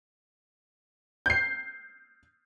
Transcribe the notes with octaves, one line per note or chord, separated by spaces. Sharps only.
G6 C7